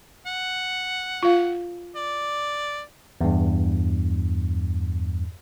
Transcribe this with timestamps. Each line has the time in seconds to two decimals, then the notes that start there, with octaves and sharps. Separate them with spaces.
0.27 F#5
1.23 F4 F5
1.96 D5
3.21 E2 G2